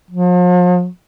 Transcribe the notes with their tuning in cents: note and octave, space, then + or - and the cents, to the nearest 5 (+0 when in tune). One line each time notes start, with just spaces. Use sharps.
F3 +40